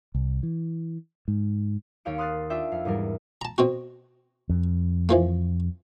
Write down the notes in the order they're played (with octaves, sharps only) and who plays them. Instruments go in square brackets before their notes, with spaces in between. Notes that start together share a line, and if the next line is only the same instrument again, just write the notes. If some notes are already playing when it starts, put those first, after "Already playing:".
[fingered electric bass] C2
E3
G#2
[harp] D#2 A#4 C#5 F5 G5 D7
C6 D#6 F6 F#6 A6 C7
D4 F4 D5 E5 G5
F2 F5
E2 G#2 G3 A#4
[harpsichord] A5 A#5
B2 C4 F#4
[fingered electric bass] F2
[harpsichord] E3 F3 A#3